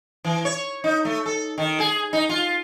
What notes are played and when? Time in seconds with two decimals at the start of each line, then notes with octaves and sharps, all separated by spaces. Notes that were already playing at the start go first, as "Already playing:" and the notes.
0.25 E3
0.45 C#5
0.84 D#4
1.05 A3
1.26 A4
1.58 D#3
1.80 G#4
2.13 D#4
2.29 F4